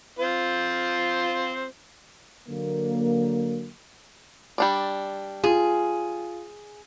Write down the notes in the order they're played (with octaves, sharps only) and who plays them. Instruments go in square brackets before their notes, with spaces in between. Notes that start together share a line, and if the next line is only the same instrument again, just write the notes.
[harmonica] C4 F4 C5
[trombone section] D3 F#3 A#3
[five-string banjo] G3 D4 D5
[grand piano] F4 [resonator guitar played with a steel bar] G#4